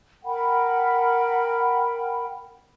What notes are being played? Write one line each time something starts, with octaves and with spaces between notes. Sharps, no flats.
A#4 F#5 G5 B5